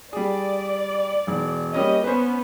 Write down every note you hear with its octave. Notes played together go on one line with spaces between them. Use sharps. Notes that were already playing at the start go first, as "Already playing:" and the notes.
G3 G#4 D5
E1
G3 A#3 C#4 G4 D#5
B3 C#4 B4 C5